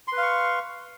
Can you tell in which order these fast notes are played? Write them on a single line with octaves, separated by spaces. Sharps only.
C6 B4 F5 C#6